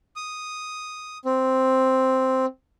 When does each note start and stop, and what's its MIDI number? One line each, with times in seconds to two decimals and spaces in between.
0.16 1.18 87
1.25 2.46 60